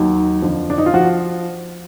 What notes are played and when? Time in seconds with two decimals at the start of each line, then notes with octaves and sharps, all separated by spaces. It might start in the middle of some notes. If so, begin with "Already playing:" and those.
Already playing: D#2 D#3 F#3
0.42 F2 D3 F3
0.70 D4
0.78 D#4
0.86 F4
0.94 F3 F#4